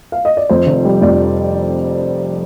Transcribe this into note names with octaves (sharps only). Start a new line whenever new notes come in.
F5
D#5
D5
F2 C5
F1
G3
F2 D5